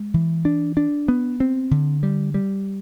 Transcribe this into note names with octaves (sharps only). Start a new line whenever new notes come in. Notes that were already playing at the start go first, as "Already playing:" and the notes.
Already playing: G#3
E3
D4
D4
B3
C4
D3
G3
G3